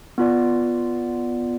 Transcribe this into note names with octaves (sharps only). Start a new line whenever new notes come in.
B3 F4 D5